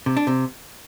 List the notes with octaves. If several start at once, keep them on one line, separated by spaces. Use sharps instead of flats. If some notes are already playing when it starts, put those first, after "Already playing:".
C3
D4
C3